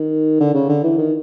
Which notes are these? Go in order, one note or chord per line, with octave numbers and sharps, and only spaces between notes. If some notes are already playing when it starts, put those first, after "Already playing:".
Already playing: D#3
D3
C#3
D3
E3
D#3